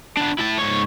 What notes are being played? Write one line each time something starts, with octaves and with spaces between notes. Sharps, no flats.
B3 D4
E4 A5
G#2 C#5